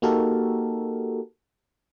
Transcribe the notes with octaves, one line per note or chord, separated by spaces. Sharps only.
A#3 D#4 F#4 G4 A4 A#4